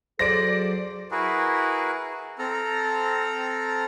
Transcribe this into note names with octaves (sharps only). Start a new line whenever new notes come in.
F#3 G#4 A4 C5 D5 A#6 D7
E4 F#4 G#4 A#4 B4
C4 A4 A#5 F6